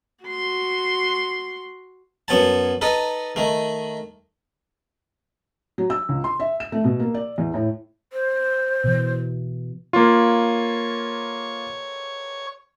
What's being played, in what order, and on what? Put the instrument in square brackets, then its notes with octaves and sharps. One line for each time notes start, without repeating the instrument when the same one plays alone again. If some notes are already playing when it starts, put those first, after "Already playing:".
[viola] F#4 C6
[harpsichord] F#2 B3 C#5 A5
D#4 A4 B4
D#3 A3
[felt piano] F#3
E6
C#2
C6
E5
E7
A3
B2
A#3
D5
E2
A2
[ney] C5
[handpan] B2 E3
[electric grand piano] A#3 F4 [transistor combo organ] C#5